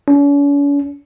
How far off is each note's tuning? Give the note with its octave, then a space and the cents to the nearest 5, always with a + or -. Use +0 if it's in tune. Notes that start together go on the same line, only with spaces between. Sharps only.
C#4 +45